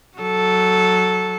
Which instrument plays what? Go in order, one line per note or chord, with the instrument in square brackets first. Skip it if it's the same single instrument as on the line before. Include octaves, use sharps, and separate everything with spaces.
[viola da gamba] F#3 A4